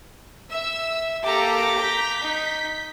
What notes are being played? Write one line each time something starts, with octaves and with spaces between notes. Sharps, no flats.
E5 E6
A#3 G4 A4 A#5 D6
G6 B6
D#4